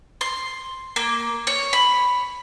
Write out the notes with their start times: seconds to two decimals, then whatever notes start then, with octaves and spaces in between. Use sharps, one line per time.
0.21 C6
0.96 A#3
1.47 C#5
1.73 B5